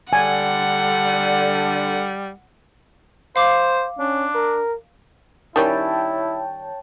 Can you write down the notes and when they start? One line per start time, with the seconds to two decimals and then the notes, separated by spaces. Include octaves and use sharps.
0.13 D3 G3 F#5 G#5
3.36 C5 F5 D6 C7
3.99 C#4 D4
4.35 A#4
5.56 D#3 G3 C#4 E4 C#5 G5 A5